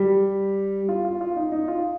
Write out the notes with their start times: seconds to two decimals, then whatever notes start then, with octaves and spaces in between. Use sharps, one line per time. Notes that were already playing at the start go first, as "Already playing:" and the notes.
Already playing: G3 G4
0.89 F4
1.05 F4
1.21 F4
1.36 D#4
1.52 D#4
1.68 F4